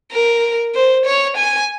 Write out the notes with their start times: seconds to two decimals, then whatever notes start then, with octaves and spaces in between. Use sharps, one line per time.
0.12 A#4
0.75 C5
1.06 C#5
1.37 G#5